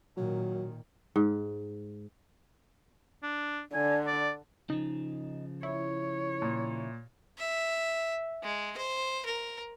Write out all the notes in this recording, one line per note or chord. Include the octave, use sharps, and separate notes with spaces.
A#2 D#3 F#3
G#2
D4
D3 G#5
D5
C#3 F3 D#4
E4 C#5
A#2
E5
G#3
C5
A#4